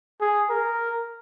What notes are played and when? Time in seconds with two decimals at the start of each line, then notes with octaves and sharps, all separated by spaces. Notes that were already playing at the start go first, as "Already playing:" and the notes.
0.21 G#4
0.50 A#4